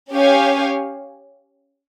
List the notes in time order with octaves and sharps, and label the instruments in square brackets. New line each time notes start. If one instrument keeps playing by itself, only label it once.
[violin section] C#4 G4 C#5 F5 G#5